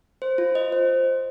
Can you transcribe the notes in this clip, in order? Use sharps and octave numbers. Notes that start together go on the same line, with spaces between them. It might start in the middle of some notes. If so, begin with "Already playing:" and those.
C5
F4
D#5
C5